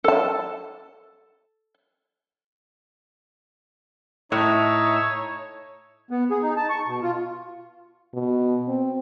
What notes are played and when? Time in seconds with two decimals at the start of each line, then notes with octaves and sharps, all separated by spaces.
0.04 A4 A5
4.32 A2 D#4 C#5 E5
6.10 B3
6.31 G#4
6.43 D#4
6.57 A5
6.69 C#6
6.87 B2
7.02 F4
8.14 B2
8.68 C4